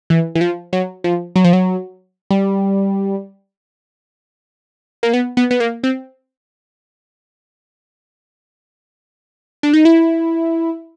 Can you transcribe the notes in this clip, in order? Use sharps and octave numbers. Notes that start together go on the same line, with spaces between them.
E3
E3
F3
F#3
F3
F#3
F3
F#3
G3
A#3
B3
B3
B3
A#3
C4
D4
D#4
E4